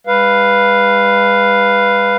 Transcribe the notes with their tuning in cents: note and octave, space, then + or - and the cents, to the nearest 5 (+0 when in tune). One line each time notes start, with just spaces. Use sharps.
G#3 -45 B4 +0 F5 -5